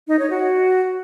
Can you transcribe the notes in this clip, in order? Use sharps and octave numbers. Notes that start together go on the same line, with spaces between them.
D#4
C#5
F#4